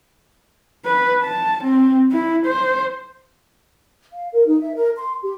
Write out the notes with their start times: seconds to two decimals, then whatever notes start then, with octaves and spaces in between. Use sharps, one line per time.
0.85 B4
1.23 A5
1.64 C4
2.12 E4
2.46 C5
4.13 F5
4.32 A#4
4.47 D#4
4.60 E5
4.74 A#4
4.97 C6
5.23 G4